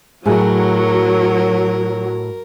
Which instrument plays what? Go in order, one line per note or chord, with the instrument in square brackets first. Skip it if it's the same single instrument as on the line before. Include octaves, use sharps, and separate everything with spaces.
[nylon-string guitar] A2 G#4 [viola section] F#3 [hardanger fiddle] A#4